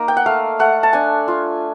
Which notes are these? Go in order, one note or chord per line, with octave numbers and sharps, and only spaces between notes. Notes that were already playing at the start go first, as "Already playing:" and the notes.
Already playing: A#3 D#4
G5
F#5
A3 F5
A3 F#5
A5
D4 G#5
F4